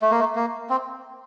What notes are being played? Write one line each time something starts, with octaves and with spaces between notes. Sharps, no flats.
A3
A#3
A3
A#3
C4